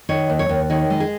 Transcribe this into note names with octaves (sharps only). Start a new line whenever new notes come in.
D#3 C#5
D#2
C#5
D#2
D#3 C#5
G#3
G#4